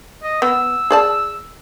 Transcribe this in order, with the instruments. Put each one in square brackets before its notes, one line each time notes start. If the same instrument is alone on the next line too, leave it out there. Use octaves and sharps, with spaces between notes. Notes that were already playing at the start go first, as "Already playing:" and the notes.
[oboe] D#5
[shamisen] B3 [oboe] E6
[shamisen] G#4 D5 A5